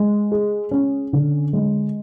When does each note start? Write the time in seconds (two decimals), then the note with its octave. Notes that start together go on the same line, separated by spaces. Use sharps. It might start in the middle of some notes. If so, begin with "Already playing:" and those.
Already playing: G#3
0.32 G#4
0.71 C#4
1.13 D3
1.53 G#3